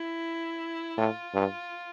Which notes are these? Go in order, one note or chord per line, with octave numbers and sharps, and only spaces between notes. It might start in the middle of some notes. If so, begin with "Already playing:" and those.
Already playing: E4
A2 F4
G2